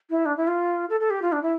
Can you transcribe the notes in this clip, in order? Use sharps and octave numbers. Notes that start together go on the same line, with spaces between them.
E4
D4
E4
F4
A4
A4
G4
F4
D4
E4